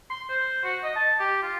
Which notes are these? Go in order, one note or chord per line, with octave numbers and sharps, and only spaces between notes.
C6
C5
F#4
D#5
A5
G4
F4